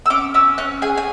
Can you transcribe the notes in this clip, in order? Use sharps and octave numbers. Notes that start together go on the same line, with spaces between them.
E6
C#4 D6
C#4 E6
C#4 F#6
G#4 G#5
G#5